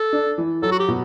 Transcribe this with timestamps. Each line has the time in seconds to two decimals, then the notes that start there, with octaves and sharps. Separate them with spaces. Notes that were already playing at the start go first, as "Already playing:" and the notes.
Already playing: A4
0.13 D4
0.38 E3
0.62 F#3 A4
0.71 F#4
0.79 G4
0.88 B2